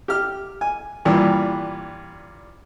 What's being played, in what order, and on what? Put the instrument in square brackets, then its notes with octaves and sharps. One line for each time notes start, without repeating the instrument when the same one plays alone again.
[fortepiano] G4 F6
G#5
G2 A#2 E3